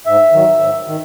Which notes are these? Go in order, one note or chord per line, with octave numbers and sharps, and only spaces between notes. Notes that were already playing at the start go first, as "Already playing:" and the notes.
G#2 E5
D#3 F#3
G#2
D#3